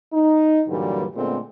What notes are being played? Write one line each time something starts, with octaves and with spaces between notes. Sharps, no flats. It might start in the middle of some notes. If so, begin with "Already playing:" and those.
D#4
G2 A#2 D3 E3 F#3 G3
A#2 D3 G#3 A3 B3 C4